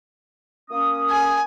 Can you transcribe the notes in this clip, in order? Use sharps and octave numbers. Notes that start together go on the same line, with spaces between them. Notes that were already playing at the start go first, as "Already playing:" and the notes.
A#3 C#4 D#6
G#5